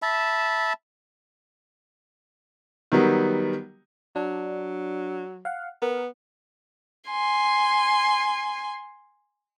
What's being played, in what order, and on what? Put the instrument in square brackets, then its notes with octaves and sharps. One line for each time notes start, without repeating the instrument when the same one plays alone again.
[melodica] E5 A5 B5
[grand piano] D#3 F#3 G3 B3
[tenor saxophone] F#3 [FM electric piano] D4
[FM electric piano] F5 F#5
[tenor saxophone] B3 [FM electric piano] A#4
[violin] G#5 C6